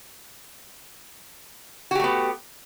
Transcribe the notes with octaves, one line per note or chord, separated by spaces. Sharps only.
A3 B3 F#4 G4